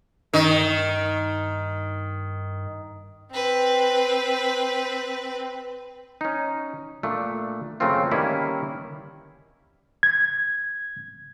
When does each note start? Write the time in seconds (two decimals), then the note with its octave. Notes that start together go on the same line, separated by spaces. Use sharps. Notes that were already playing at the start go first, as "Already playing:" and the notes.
0.33 G2 D#3
3.32 C4 B4
6.21 C#4 D#4
7.03 A#2 A3 D4
7.80 F#2 C#3 A3 A#3 C4 F4
8.12 D#3 G3 A#3 C#4 E4
10.03 G#6